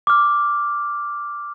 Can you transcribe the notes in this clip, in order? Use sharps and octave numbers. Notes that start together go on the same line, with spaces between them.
D6 F6